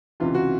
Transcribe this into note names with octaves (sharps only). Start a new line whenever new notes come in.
C#2 C3 E3 F4
F#4